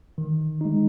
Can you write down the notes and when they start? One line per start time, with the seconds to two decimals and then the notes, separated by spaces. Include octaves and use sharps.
0.18 D#3
0.61 G#3 D#4